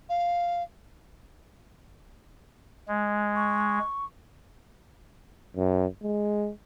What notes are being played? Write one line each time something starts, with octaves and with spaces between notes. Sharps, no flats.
F5
G#3
C#6
F#2
G#3